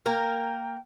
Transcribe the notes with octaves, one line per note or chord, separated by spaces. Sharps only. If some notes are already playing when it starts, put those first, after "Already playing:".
A#3 A#4 G5